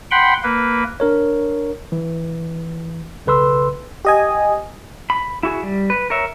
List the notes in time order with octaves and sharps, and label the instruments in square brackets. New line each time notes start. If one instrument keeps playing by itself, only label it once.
[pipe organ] F#5 G5 B5 C6
A#3 B4
[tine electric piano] D4 A#4 C#5
E3
B1 C#3 A4 B4 C6 E6
[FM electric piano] G4 D#5 G#5
[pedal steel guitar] B5
E4 F#4 G#4
G3
B4
A#4 C#5 E5